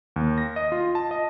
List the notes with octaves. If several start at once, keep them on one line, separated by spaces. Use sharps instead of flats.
D#2
A#6
D#5
F4
A5
D#5